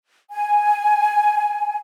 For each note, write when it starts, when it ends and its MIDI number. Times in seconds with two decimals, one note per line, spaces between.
0.32 1.77 80